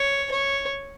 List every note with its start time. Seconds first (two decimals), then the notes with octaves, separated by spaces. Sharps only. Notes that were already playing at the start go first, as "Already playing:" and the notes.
Already playing: C#5
0.31 C#5